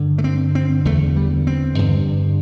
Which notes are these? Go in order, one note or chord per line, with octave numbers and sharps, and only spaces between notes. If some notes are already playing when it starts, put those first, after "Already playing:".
Already playing: G2 D3
A3
C4
C4
E2 D3 A3
G3
C4
G2 D3